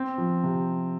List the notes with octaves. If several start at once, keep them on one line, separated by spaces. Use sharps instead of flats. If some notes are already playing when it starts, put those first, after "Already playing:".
Already playing: C4
F3
C3